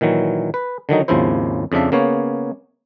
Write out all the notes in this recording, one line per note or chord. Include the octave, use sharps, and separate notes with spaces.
A#2 D#3 E3 F#3
B4
D3 D#3 F#3 D#4
G#1 D#2 C#3 F3 E4 C5
F2 C#3 F3 D4 E5
C#3 A#3 B3 C#5